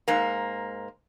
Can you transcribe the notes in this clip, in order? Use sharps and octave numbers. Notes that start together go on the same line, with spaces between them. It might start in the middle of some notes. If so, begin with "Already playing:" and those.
G#2 A#3